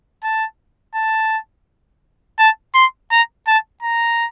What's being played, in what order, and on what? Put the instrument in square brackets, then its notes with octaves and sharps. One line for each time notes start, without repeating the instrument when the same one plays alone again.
[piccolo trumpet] A5
A5
A5
C6
A#5
A5
A#5